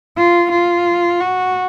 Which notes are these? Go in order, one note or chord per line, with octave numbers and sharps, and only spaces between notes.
F4
F4
F#4